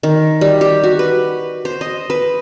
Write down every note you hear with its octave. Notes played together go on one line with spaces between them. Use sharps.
D#3
G3
G4
F#4
B4
C5
D#5
B4